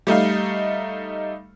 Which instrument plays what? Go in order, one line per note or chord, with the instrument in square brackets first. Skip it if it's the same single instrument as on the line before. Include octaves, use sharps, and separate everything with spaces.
[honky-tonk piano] G3 A3 D#4 F5